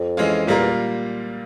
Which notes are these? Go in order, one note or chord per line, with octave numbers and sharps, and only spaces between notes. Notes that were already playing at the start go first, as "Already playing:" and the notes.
Already playing: F2
E3 G#3 C#4 F4
F2 A#2 G3 A#3 F4 A#4
E2